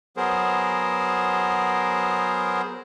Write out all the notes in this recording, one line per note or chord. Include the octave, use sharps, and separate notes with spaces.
F#3 B3 G#4 A#4 C5